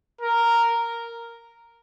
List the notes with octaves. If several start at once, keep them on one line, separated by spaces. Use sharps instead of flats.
A#4